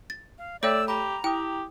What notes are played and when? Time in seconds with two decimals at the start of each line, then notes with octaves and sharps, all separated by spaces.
0.10 A6
0.38 F5
0.63 A3 A4 C#5 D5 E5 G5 E6 G6
0.88 G4 A#5 B5
1.24 E4 G4 G5 D#6